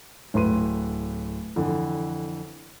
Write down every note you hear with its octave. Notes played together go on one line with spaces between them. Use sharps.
D1 A2 B4 C6 D#7
F2 D3 E3